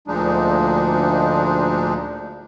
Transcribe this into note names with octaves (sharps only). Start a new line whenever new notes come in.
D2 A#2 F3 G#3 D4 D#4